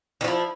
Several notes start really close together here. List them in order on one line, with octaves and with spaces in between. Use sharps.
D#3 F3 E4